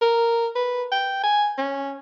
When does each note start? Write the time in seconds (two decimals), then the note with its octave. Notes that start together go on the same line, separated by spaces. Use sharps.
0.02 A#4
0.55 B4
0.91 G5
1.23 G#5
1.58 C#4